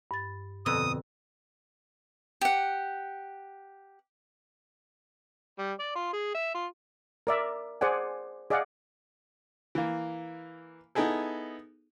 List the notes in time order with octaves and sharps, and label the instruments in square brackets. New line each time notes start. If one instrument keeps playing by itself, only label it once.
[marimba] G2 A6
[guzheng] F2 B2 [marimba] D3 E6 [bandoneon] D#6
[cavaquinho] G4 F#5
[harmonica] G3
D5
F4
G#4
E5
F4
[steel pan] A#4 D5 E5
G#4 C5 D5 F#5 G#5
G#4 D5 D#5 F5 F#5
[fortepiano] E3 A#3
B3 D#4 E4 G#4 A4